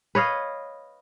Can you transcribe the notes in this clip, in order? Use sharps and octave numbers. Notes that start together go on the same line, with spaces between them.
B4 C#5 D#5 F5